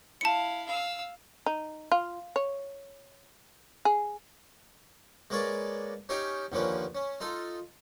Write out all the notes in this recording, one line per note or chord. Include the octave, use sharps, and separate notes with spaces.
E4 F5 A5 C#7
F5 E6
D#4
F4
C#5
G#4
G#3 A#3 B4 C#5 D5
C#4 D#4 G4 C#5 F5 G5
D#2 D3 F3 A#3 C#4 B4
C#4
D#4 F4 A4